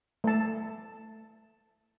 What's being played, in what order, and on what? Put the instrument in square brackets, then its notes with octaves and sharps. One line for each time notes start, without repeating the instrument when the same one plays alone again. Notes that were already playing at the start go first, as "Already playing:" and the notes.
[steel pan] A3 A5